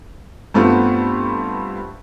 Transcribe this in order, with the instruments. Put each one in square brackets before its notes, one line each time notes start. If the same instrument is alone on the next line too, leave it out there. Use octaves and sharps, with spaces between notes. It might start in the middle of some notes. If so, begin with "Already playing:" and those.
[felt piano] G2 A3 B3 C4 F4